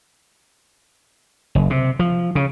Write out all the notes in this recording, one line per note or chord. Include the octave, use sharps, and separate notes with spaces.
F#1
C3
F3
C#3